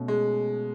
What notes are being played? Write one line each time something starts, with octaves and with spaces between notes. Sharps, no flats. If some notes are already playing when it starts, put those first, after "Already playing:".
Already playing: B2 A3 C#4
G#3